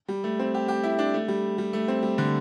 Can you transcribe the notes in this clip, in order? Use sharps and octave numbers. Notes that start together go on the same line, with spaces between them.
G3
A3
C4
G4
G4
E4
D4
A3
G3
G3
A3
C4
G3
D3